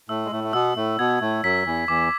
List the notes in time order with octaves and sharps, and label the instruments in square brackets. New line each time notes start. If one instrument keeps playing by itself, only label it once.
[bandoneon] A2 A3 [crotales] E6
[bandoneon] G#3
A2 A3
A3
[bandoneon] B2 B3 [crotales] E6
[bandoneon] A2 A3
[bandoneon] B2 B3 [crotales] G#6
[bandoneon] A2 A3
[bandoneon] F#2 F#3 [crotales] B6
[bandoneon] E2 E3
[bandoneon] E2 E3 [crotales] D6